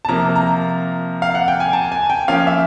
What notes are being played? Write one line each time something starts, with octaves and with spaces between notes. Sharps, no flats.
A5
C3 F3 A#3 A#5
A#5
F5
F#5
G5
G#5
A5
G#5
G5
F3 A#3 C#4 F5
E5